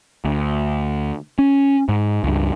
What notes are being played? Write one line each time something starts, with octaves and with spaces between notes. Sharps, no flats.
D2
C#4
G#2
C#2 G2